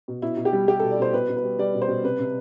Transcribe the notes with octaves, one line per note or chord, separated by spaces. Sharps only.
B2
B2 E4
B2
G4
G3
G3 G4
B2 A4
D5
B2 C5
B2 B4
B2
B4
G3
G3 D5
B2
C5
B2
C3 B4
C3